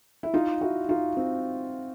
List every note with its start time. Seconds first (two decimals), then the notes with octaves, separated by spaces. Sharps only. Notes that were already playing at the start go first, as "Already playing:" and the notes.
0.23 E4
0.34 D#4 F4
0.61 E4 F#4
0.89 D#4 F4
1.17 C4